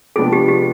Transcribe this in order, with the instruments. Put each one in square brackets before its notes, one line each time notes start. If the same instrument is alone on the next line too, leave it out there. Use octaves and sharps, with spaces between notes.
[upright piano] C3 F3 G#3 B3 D4 [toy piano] G#4
[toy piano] G4
G4